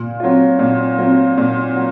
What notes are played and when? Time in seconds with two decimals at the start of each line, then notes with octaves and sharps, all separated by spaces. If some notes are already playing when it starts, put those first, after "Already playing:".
Already playing: A#2
0.20 F#3 C4 F4
0.59 A#2
0.98 F#3 C4 F4
1.38 A#2
1.76 F#3